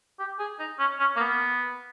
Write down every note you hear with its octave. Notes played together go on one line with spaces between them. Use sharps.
G4
G#4
D#4
C#4
C#4
A#3
B3